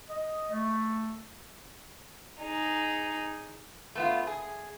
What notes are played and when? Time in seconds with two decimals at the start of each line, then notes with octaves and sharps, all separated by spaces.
0.10 D#5
0.52 A3
2.42 D#4 G#4
3.95 A3 B3 F4
4.27 G#4